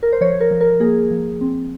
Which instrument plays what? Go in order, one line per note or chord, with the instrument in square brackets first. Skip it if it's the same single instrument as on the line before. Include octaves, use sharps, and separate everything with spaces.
[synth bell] A#4
C5
F3 C#5
A#4
F3
A#4
A#3 G#4
F3
C4